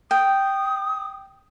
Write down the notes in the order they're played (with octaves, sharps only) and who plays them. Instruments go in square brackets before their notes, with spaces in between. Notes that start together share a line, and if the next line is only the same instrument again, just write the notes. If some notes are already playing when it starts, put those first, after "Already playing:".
[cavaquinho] G5 [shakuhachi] D#6